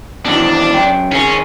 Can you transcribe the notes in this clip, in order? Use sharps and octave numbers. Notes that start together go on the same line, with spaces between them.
B2 D#3 E3 D4
F#2 G5
D#3 C#4 G#4